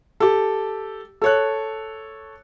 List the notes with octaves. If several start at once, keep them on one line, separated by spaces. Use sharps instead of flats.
G4 A4
A4 C#5 F#6